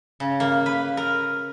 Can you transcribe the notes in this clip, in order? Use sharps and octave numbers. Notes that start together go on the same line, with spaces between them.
C#3
A#3
B4
A#4